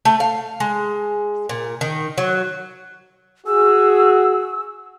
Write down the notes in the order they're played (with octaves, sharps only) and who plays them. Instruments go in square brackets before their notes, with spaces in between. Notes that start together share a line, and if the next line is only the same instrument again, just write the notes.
[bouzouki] A3
F5
G#3
A#2
D#3
F#3
[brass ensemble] F#4 G#4 [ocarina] E6